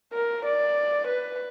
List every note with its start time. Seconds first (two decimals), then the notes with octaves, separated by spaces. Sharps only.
0.13 A#4
0.45 D5
1.08 B4